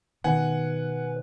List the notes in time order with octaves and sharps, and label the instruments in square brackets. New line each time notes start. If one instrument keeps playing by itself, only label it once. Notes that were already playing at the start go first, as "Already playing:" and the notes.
[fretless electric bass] B2 D#3 [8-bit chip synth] B4 [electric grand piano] F#5 G#5